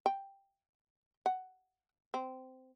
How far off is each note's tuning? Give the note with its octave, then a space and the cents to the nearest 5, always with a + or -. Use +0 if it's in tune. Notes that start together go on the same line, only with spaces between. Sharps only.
G5 +5
F#5 +10
C4 -15